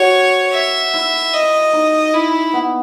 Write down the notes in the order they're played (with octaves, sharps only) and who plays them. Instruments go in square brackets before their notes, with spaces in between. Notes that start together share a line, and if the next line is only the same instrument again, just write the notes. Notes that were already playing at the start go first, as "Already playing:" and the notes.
Already playing: [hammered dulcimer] F#4 [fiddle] C#5
[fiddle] E5
[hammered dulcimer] E4
[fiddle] D#5
[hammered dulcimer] D#4
[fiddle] E4
[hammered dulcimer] B3